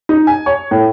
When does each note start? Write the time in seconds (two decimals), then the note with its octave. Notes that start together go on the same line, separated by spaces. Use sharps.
0.09 D#4
0.27 G#5
0.46 C#5
0.71 A2